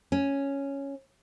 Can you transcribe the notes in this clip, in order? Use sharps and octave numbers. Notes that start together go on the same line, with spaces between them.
C#4